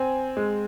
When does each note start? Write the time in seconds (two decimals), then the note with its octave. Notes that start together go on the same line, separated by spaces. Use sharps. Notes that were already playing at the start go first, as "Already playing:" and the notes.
Already playing: C4 G#5
0.37 G#3